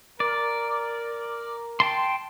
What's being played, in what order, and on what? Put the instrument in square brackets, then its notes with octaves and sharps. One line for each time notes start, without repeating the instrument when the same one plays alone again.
[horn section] A#4 [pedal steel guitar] D5
[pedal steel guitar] G5 A5 C6